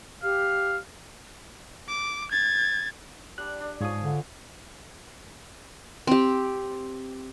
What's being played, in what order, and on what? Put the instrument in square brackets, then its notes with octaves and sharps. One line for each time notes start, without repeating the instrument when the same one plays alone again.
[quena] G4 [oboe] F5
[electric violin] D6
G#6 A6
[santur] G3 D4 [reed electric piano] F#6
[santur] D4
[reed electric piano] G#2 D#6 [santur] F3 G#4 C#5
[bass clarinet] D3
[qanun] C4 G4